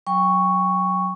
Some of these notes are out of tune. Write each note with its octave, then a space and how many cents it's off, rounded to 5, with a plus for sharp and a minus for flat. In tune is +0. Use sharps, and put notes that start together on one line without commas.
F#3 +0 G5 +35 C#6 +0